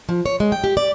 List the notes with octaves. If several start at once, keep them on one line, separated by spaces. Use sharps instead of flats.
F3
C#5
G#3
G5
G4
D5